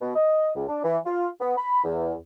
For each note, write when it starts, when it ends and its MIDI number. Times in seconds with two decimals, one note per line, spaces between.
0.01 0.13 47
0.15 0.50 75
0.56 0.65 37
0.68 0.82 62
0.84 0.98 52
1.06 1.28 65
1.41 1.53 59
1.57 1.84 83
1.84 2.14 40